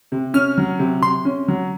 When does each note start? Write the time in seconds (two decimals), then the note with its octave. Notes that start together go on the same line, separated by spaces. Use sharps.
0.12 C3
0.34 C#4 F6
0.58 F#3
0.79 C3
1.02 C3 C6
1.25 C#4
1.48 F#3